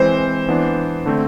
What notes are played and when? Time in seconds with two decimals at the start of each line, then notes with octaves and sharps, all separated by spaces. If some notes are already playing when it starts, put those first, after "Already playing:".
Already playing: E3 G#3 C4 C5
0.48 E3 B3 D4
1.06 D3 A3 C4